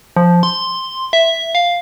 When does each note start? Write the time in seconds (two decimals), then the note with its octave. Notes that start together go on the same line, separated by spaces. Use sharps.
0.16 F3
0.43 C6
1.13 E5
1.55 F5